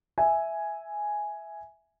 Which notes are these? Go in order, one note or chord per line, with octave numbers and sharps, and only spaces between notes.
E5 G#5